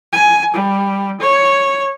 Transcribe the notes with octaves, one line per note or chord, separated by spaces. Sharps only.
G#5
G3
C#5